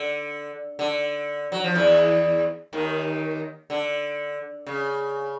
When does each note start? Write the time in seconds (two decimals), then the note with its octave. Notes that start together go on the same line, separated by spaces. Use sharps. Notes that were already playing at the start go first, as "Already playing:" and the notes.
Already playing: D3
0.79 D3
1.52 F#3
1.64 F3
1.75 E2 E3
2.73 D#2 D#3
3.70 D3
4.67 C#3